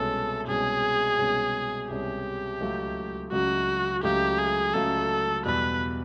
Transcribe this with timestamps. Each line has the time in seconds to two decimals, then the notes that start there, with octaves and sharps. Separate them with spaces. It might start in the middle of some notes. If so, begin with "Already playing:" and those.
Already playing: C2 B2 G#3 C#4 A4
0.47 C2 B2 G#3 C#4 G#4
1.18 C2 B2 G#3 C#4
1.89 C2 B2 G#3 C#4 G4
2.60 C#2 C#3 F#3 A3
3.32 C#2 C#3 F#3 A3 F#4
4.03 C#2 C#3 F#3 A3 G4
4.39 G#4
4.74 C#2 C#3 F#3 A3 A4
5.45 E2 B2 G3 B4